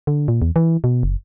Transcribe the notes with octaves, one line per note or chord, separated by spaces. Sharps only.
D3
A#2
E2
E3
B2
F#1